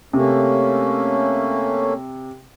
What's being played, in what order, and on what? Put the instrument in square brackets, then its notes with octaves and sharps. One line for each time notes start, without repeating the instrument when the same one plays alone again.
[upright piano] C3 [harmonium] A3 A#3 C#4